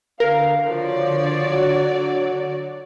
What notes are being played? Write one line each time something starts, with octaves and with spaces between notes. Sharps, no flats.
D3 A#4 F5
F3 F#4 C#5 D5
F#3